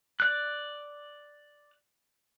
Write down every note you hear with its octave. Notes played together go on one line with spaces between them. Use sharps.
D5 F#6